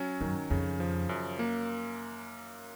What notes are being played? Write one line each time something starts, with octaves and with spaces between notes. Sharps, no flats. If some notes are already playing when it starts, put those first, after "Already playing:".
Already playing: F#3 C#4
F#2 D#3
F2 C#3
F3
F#2
A#3